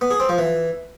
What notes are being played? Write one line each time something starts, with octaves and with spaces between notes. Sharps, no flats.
B3
G#4
C4
F3
E3